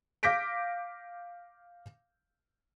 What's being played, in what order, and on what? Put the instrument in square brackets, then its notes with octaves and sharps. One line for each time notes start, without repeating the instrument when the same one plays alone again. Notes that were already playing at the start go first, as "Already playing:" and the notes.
[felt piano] F5 D6 G6 A#6 B6 D7